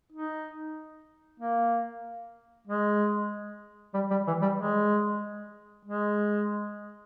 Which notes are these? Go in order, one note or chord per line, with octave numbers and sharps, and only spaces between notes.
D#4
A#3
G#3
G3
G3
E3
G3
G#3
G#3